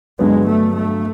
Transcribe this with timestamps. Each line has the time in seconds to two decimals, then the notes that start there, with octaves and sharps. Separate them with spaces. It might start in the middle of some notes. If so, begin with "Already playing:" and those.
0.19 G2 D3 F#3 G#3 B3
0.47 A3
0.75 A3